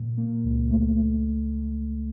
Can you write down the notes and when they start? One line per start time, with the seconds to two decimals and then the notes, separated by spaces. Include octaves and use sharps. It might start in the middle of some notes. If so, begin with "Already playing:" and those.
Already playing: A#2
0.17 A#3
0.44 C#2
0.70 A3
0.98 A3